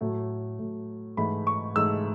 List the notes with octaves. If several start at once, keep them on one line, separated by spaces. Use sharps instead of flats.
A2 F#3 A3
A2 F#3 A3
G#2 E3 A3 B5
C#6
G#2 E3 A3 E6